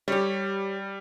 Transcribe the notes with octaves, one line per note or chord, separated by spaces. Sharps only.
G3 G4 C#5